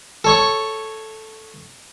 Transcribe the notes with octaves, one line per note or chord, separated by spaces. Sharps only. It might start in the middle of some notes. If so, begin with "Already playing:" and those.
A4 C#5 C#6